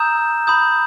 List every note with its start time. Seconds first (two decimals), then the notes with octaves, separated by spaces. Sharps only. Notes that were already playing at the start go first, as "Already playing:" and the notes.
Already playing: A#5 D#6 E6 G6 E7
0.47 B5 D#6 G6